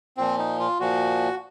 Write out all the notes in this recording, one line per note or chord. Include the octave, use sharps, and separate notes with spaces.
A#2 F3 C4
D#4
F4
A#2 F3 F#4